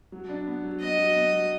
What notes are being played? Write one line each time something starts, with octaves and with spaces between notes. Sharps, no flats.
F#3
D4
B3
F#3
B3 D#5
F#3
B3
F#3